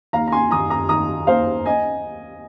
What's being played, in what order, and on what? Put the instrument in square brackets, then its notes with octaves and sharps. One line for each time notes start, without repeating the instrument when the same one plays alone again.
[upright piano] D#2 F5 A#5
A#5
G#5 C6
D#3 A#5 D#6
A#5 D#6
D#3 A#5 D#6
D#2 C5 F5
D#5 G#5